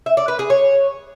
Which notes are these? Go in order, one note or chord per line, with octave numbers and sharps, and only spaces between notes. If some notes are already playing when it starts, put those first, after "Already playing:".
E5
D5
B4
G#4
C#5